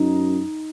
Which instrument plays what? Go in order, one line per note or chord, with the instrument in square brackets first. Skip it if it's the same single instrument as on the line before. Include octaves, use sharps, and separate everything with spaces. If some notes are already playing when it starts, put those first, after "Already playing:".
Already playing: [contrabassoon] F#2 [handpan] D#4